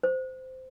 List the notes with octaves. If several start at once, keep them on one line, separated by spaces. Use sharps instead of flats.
C5